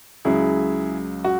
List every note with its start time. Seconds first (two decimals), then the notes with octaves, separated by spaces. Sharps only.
0.25 C#2 C#3 F#3 E4 G#4
1.25 F#4